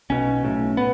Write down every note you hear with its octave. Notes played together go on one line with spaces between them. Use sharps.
B1 B2 C#4
B1 A2
B3